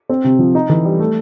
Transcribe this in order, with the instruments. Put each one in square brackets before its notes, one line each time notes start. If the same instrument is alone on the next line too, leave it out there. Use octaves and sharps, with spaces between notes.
[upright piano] C4
C3
F3
D#4
E3
G3
A3